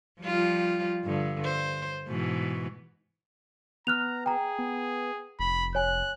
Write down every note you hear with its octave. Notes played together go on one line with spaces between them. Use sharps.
F3 G3 F4
G2 D3
C5
G#2 B2 E3
B3 A#5 F6 F#6 F7
G#4 G5 A#5
B3
F1 B5
C#5 G#5 F#6